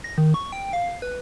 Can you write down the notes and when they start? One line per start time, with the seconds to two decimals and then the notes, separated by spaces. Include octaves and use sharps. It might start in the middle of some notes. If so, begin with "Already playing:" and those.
0.04 A#6
0.18 D#3
0.34 C#6
0.52 G5
0.73 F5
1.02 B4